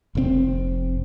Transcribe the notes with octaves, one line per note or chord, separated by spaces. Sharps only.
F1 C3 C4